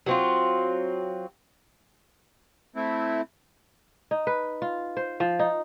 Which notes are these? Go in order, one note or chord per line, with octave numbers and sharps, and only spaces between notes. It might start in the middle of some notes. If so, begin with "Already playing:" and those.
F#3 C4 F4
A3 C4 E4
D#4
B4
F4
C5
F3
D#4